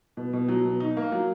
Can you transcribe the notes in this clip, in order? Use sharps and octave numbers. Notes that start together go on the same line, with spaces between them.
B2
B2
F#3
B2
D#4
A#3
F#3